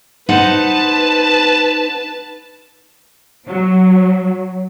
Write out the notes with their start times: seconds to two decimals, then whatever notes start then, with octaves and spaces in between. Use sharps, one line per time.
0.29 D#4 B4 C5 F#5 A5
3.48 F#3